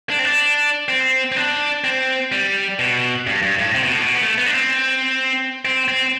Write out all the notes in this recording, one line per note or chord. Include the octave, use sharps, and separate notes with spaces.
D4
C4
D4
C4
C4
D4
C4
G3
B2
G2
G2
A2
C3
B2
A2
B2
B3
A3
B3
D4
C4
C4
C4